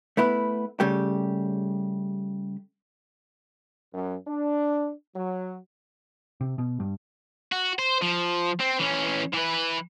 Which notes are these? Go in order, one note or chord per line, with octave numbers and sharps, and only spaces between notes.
A3 B3 E4 B4
C#3 G3 A3 G4
F#2
D4
F#3
C3
B2
G2
F#4
C5
F3
C4
E3 C#4
E3 B4